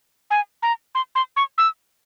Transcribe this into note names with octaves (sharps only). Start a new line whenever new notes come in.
G#5
A#5
C6
C6
C#6
E6